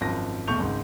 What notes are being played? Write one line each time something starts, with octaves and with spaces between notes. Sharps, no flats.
G#1 F#2 F3 A#6
B1 E2 A3 C#6 G6 F7
G#1 C#2 G#2